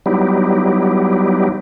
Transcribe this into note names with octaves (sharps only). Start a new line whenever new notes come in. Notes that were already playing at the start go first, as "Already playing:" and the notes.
F#3 G3 B3 D#4 E4 G4